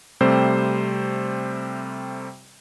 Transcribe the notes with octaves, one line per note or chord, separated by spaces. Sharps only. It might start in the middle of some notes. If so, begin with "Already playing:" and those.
C3 G3 A3 C4 C5